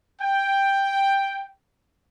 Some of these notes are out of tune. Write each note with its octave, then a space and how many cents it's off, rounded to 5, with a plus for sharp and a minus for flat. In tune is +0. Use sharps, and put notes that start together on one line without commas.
G5 +5